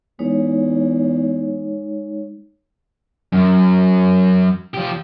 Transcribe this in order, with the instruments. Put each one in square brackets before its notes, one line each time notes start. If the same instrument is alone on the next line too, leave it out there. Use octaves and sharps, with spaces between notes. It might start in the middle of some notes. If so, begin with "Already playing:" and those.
[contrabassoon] E2 [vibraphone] G#3 D#4 C#5
[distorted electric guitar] F#2
F3 G4